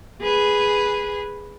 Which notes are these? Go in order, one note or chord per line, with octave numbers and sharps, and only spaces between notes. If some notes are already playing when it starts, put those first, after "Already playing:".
G#4 B4